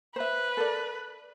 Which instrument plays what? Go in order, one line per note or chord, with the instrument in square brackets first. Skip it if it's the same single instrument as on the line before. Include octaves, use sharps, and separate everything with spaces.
[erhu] B4 [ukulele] C5 E5
[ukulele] A4 A#4 D5